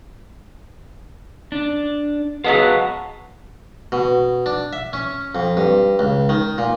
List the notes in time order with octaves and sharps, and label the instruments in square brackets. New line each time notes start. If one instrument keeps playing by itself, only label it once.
[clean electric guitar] D4
[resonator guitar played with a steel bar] F#3 G#3 B3 [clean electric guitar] F5 F#5 A5
[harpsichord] B2
D4
E5
C#4
F2
G2
C#2
D#3
A#2